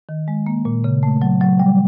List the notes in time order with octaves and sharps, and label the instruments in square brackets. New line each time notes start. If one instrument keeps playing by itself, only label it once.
[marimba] D#3
G#3
A#3
A#2
C#3
A3
F#3
F#3
G3